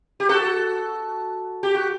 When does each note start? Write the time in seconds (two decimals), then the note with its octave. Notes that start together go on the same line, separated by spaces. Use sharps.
0.20 G4
0.29 F#4 A4
1.63 G4
1.75 F#4